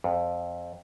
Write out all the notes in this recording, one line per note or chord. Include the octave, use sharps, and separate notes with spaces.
F2